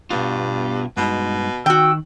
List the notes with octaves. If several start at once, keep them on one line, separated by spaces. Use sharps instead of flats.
G2 B2 B3 F4
G2 B2 G#3 D#4
D#3 F#4 G5 E6